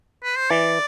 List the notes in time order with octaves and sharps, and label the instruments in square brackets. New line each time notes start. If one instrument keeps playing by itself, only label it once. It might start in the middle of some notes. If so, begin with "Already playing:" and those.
[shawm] B4
C5
[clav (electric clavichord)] E3 [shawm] D5